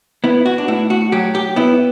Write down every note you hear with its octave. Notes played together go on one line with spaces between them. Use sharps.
B3 E4
F#4
D4
A2 E4
F#4
F#3 G4
G4
B3 E4